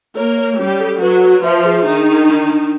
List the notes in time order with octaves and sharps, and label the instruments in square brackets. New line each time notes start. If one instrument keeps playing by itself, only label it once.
[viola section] A#3 A#4 [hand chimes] C#5
[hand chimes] C#5
[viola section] G3 G4 [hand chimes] C#4
[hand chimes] A4
[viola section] F#3 F#4 [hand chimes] B4
[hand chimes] B4
[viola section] F3 F4 [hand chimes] E5
[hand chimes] G#4
[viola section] D#3 D#4 [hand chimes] D4
[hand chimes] D4
D4
D4